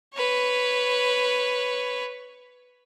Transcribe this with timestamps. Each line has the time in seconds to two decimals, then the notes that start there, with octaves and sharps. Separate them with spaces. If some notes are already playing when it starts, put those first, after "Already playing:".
0.14 B4 C#5